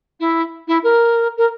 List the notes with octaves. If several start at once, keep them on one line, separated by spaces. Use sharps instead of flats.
E4
E4
A#4
A#4